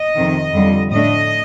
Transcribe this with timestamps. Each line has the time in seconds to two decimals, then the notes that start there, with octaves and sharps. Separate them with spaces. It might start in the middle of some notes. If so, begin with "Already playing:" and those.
Already playing: D#5
0.16 F2 C3 D#3
0.54 F2 D3 G3
0.92 A2 A3 D4 D#5